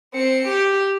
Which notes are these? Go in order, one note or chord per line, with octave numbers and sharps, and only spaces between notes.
C4 C#7
G4